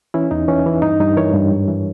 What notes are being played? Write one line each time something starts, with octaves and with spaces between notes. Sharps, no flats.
E3 C#4 E4
E2 D#4
E3 C#4
E3
G2 D#4
G2 D#4
E3 A#4 C#5
G2
G#2
E3